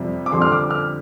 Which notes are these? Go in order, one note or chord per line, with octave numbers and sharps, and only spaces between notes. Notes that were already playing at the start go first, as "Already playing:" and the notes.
Already playing: F2 C3 G3
D6
F2 D3 G3 C6
F6
D6
F6